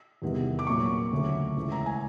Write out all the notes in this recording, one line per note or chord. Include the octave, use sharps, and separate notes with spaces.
E2 C3 D#3 G3 B3
D6
A#2 F#3 A#3 C#6
D2 C#3 F#3 A3
C#2 C#3 E3 A3
A#5
G#5